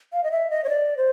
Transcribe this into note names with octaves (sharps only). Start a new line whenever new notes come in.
F5
D#5
E5
D#5
C#5
D5
C5